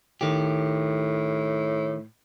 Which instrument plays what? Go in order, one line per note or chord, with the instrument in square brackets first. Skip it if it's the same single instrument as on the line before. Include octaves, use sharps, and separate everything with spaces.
[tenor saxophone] A2 [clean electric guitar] D#3 G4